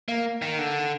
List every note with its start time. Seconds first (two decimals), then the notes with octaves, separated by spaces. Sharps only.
0.08 A#3
0.42 D#3
0.58 D3